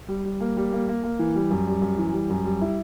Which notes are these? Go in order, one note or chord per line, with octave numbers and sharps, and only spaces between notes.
G3
G3
A#3
G3
A#3
A#3
A#3
E3
G3
F#2
G3
F#2
E3
G3
F#2
G3
E4